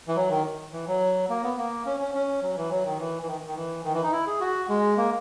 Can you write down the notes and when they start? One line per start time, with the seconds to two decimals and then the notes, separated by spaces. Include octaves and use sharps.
0.08 E3
0.16 F#3
0.30 D#3
0.73 E3
0.87 F#3
1.29 A#3
1.43 B3
1.58 A#3
1.86 C#4
2.00 C#4
2.15 C#4
2.43 F#3
2.57 E3
2.71 F#3
2.85 D#3
2.99 E3
3.23 E3
3.27 D#3
3.46 D#3
3.56 E3
3.84 D#3
3.93 E3
4.03 D#4
4.12 E4
4.27 G#4
4.41 F#4
4.69 G#3
4.97 A#3